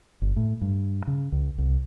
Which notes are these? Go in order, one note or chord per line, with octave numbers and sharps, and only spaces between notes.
G1
A2
G2
C#3
C#2
C2